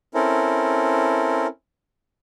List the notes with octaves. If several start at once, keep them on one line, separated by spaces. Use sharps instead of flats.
C4 C#4 E4 A4 A#4